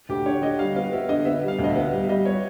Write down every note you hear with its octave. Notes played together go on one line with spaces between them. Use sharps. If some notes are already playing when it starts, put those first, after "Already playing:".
D2 G4
D3 C#5
D3 D#5
G3 F5
B3 F5
B3 E5
D3 D#5
B3 E5
G3
F5
D2
D#5
E5
B3
G3
E5
G3 D#5
B3 C#5